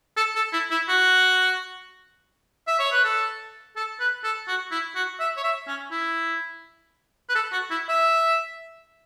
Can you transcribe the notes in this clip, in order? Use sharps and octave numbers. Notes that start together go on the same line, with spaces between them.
A4
A4
E4
E4
F#4
E5
C#5
B4
A4
A4
B4
A4
F#4
E4
F#4
E5
C#5
E5
C#4
E4
B4
A4
F#4
E4
E5